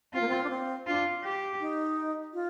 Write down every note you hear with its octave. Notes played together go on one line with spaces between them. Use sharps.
C4 F4
A#3
C4
D4
C4
D4 F4
G4
D#4
F4